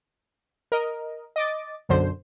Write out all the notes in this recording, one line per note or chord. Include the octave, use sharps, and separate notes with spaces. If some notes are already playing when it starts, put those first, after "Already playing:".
A#4 D#5
D#5 D6 A6
B1 F#2 D3 C5